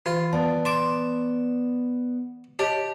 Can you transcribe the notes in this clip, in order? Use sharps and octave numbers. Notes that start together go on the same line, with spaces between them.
E3 F4
B3 D5 A5
A5 C6 D6
G4 C#5 D#5 A5